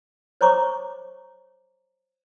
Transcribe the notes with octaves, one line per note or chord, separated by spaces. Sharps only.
C5 C#5 A#5 C#6 D6